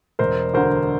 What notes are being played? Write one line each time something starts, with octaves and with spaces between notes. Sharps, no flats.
E1 A#4 C5
D2 D3 A#4 C5